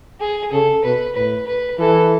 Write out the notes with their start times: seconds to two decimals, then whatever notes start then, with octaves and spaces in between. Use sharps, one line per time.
0.21 G#4
0.52 C#3 A4
0.84 B2 B4
1.15 A2 B4
1.47 B4
1.79 E3 A4